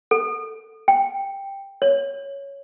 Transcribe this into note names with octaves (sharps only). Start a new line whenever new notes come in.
A4
G5
C#5